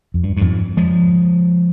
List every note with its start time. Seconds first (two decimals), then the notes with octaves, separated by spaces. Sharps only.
0.14 F2
0.23 G2
0.37 G2
0.41 F2 G#2
0.77 F3 G#3